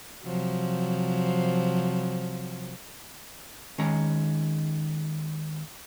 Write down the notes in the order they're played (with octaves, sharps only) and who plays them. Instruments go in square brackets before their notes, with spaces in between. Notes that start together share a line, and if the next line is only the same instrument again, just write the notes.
[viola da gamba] C3 F3 F#3
[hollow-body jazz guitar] D#3 G#3 C#4 A#5